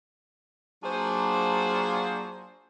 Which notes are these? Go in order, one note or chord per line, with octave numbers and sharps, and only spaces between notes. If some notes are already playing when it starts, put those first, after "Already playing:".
F#3 A#3 D4 F4 G#4 C5